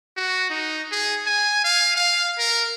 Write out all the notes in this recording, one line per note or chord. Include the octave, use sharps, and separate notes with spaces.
F#4
D#4
G#4
G#5
F5
F5
A#4